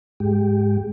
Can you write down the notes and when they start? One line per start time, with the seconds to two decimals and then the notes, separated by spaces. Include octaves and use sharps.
0.20 G#2 G#3 G4